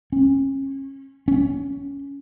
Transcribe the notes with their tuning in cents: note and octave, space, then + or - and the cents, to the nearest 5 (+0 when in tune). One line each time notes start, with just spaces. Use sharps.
C#4 -30
C#4 +15